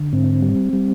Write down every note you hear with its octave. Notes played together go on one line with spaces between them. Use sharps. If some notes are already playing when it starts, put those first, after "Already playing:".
Already playing: D3
G#2 C4
G3
G3